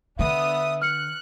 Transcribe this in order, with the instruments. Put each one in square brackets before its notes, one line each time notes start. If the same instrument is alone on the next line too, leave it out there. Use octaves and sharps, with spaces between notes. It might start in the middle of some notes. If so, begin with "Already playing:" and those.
[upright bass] D3 [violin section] B3 D4 D#6 [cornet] E5
[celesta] F6 C#7 [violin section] F#6